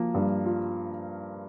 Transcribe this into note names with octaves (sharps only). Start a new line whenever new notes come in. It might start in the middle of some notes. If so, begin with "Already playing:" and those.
Already playing: F3 A#3
G2
F4